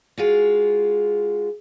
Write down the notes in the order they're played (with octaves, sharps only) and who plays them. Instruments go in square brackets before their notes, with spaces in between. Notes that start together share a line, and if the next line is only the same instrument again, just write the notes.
[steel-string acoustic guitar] G#3 F4 F#4